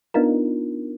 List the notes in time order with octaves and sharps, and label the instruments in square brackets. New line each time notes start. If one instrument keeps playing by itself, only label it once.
[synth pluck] B3 D4 D#4 F4 A#4